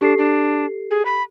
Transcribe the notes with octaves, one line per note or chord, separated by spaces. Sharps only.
D4 G4 A4 C7
D4
G#4
B5